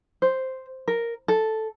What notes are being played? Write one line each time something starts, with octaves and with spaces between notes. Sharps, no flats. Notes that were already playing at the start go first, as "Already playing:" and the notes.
C5
A#4
A4